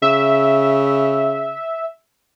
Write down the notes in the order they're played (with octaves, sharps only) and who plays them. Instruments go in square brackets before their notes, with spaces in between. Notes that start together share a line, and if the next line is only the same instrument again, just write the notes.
[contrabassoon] C#3 [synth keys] E5